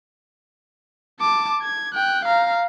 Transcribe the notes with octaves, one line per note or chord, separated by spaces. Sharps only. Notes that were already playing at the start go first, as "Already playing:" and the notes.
A5 D6
G#6
G5 F#6
F5 A#5